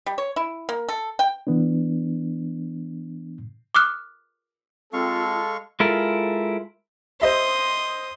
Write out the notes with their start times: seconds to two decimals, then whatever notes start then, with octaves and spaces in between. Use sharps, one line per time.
0.06 G3
0.18 C#5
0.36 E4
0.69 A#3
0.89 A4
1.19 G5
1.47 E3 B3 D4
3.75 D6 D#6 F6 F#6
4.93 G#3 C4 F4 A4 F5 C#6
5.80 G#3 E4 F4 A4 A#4
7.22 C5 D#5 E5 C6 D#6